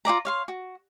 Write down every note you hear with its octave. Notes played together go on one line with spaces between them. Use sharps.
F4 G#4 D5 A#5
C#5 F5 C6
F#4